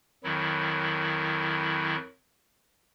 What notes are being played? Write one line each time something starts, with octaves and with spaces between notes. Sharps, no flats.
F2 D#3 F#3 E4